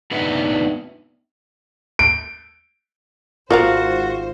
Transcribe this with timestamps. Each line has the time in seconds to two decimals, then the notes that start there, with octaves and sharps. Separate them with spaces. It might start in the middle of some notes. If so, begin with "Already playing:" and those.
0.11 B3 D4 D#4 B4 E5 F#5
1.99 D7
3.51 G#1 A#3 F4 F#4 A#4 C5 F5